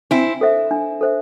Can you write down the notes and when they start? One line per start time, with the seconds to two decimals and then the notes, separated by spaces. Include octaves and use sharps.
0.11 C4 D4 E4
0.41 A4 C5 E5
0.71 D4
1.01 A4 C5 E5